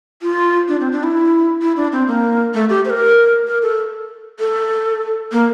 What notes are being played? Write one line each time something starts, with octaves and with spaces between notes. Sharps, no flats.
F4
D4
C4
D4
E4
E4
D4
C4
A#3
A3
G4
C5
A#4
A#4
A4
A4
A#3